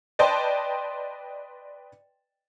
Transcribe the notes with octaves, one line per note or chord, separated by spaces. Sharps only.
B4 D5 D#5 G5 A5 C6